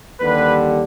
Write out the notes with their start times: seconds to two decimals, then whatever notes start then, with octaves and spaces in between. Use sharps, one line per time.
0.20 D#2 D3 G3 B4